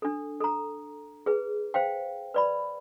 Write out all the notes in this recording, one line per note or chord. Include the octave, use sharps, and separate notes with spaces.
D4 A4
A4 A#5
G#4 B4
C5 F5 G5
B4 D5 B5